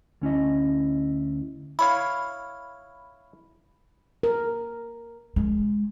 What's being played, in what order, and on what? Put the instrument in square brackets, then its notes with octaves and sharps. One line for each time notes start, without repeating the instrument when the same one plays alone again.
[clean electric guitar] D2 C#4 E4 D#5
[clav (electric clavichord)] E4 C#5 F5 [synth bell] B5
[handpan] A#4
[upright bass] G#3